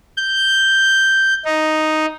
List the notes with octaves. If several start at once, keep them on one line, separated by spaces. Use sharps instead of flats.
G6
D#4